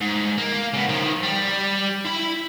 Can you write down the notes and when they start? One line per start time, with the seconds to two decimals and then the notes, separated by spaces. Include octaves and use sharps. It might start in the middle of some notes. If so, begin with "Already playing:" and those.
0.01 G#2
0.38 A#3
0.73 C#3 B3
0.88 D#3 F3
1.23 G3
2.05 E4 B5